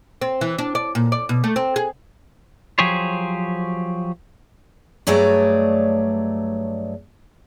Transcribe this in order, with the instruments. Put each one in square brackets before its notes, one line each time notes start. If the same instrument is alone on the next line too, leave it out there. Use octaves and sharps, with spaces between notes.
[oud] C4
E3
D4
D5
A#2
D5
B2
A3
C4
G#4
[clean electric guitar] F3 F#3 G4 G#4 C5 C#5
[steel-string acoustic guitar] G2 F#3 A3 G#4 C#5 D5